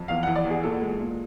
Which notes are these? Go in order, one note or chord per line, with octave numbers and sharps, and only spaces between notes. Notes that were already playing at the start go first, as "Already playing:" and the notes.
Already playing: F2
E2 F5
E3 F#5
D5
E2
G#4
A#2 A4
G#3
A#2